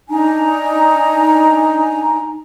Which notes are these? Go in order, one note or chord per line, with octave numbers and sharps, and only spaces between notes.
D4 D#4 G#5 A#5